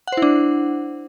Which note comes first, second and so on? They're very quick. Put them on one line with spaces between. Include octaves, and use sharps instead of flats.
F#5 C5 E4 D4